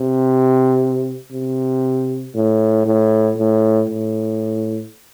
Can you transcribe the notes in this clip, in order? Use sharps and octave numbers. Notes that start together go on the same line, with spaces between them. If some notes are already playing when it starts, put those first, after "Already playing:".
Already playing: C3
C3
A2
A2
A2
A2